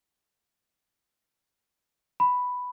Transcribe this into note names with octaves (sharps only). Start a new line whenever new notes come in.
B5